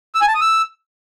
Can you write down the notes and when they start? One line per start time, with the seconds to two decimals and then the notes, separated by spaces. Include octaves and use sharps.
0.15 E6
0.21 G#5
0.28 A5
0.34 D#6
0.41 E6